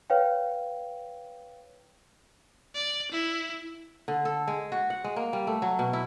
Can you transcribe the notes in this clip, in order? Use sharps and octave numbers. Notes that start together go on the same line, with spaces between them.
B4 C#5 F5 G5
D5
E4
D3
A4
G#3
F#4
F#5
G#3
A#3
G3
A3
F#3
B2
E4